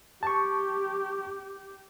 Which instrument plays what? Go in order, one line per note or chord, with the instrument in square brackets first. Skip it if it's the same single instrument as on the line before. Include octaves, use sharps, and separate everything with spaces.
[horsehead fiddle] G4 [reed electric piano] A5 C#6